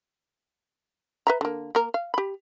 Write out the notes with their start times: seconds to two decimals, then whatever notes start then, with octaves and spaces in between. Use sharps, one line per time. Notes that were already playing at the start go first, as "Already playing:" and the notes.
1.27 B4 E5 A#5
1.41 D3 A#3
1.75 A#3 A#4
1.94 F5
2.14 G4 B5